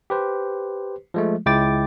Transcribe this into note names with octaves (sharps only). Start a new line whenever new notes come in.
G4 B4 C5
F3 G#3 A3
C#2 G#3 E4 G5 D6 A6